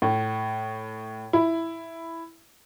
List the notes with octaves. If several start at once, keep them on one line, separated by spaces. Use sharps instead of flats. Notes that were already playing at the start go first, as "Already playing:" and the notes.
A2
E4